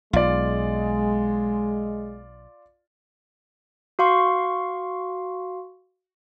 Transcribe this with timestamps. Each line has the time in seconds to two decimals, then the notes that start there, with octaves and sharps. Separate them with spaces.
0.13 B1 G#3 F4 D5
3.99 F#4 F5 C6 C#6